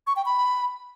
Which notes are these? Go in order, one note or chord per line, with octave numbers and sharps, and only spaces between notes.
C#6
G5
B5